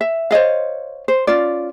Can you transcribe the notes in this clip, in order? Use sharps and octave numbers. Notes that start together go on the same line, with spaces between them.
E5
C5 C#5 D#5 F5
C5
C#4 F4 D5